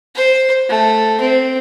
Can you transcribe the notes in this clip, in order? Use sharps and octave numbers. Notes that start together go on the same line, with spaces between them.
C5
A3
C4